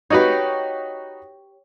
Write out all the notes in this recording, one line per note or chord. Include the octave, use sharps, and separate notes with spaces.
D#4 F#4 G4 B4 C#5